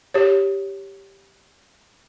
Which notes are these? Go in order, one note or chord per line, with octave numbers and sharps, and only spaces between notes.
G4 C#5